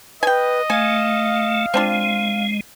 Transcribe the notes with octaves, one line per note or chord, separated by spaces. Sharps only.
B4 D#5 G5 G#5
A3 F5 G#5
G#3 C4 D4 F4